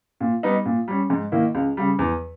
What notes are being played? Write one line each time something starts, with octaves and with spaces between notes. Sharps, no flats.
A#2
G3 B3 D#4
A#2
G3 C#4
G#2
D#3 A#3 E4
C#2
C#3 G3
E2